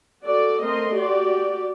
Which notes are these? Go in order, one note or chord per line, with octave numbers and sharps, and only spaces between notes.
F#4 A4 D5
A3 C4 A#4 D#5 C6
F#4 G4 D5